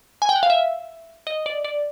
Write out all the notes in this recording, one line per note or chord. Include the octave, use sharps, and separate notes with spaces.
G#5
G5
F#5
F5
E5
D#5
D5
D5